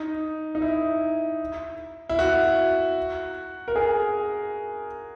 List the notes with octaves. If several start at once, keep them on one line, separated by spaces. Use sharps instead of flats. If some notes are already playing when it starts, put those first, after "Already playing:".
Already playing: D#4
D#4
E4
E4
F#4
A#4
G#4